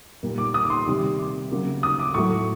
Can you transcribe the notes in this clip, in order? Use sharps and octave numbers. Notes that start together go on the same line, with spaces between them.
A#2 G3 A#3
D6
D#6
D6
C6
C3 D#3 G3
D6
C#3 F#3 A#3
D#6
D6
A2 F#3 A3 C#6